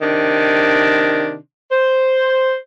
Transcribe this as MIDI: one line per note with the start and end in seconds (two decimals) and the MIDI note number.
0.02 1.36 48
0.02 1.36 51
0.02 1.36 62
1.71 2.55 72